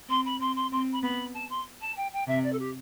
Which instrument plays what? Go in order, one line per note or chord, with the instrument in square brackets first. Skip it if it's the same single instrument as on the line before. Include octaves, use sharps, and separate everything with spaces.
[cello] C4 [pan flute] C6
[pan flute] B5
[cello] C4 [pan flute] C6
[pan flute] C6
[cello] C4 [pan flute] C6
[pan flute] B5
[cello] B3 [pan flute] B5
[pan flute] A5
C6
A5
G5
G5
[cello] C3 [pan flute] E5
[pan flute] D5
A4
G4